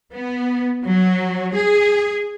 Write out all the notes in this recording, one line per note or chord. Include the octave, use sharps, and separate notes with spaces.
B3
F#3
G#4